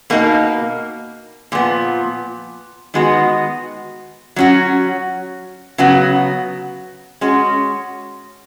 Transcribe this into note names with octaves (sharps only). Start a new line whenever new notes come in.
B2 A#3 D#4
A#2 F3 B3
D#3 G#3 B3 F#4
F#3 C#4 F#4
C#3 F#3 B3 F#4
G#3 C#4 F#4